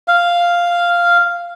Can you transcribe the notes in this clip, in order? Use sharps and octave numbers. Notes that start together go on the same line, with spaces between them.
F5